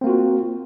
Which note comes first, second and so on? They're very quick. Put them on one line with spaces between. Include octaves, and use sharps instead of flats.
C4 A#3 F#4 F4